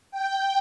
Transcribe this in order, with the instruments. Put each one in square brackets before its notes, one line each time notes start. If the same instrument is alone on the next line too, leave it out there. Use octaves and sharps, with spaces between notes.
[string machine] G5